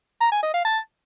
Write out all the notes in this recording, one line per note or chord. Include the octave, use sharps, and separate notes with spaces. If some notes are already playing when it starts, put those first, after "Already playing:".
A#5
G#5
D#5
F5
A5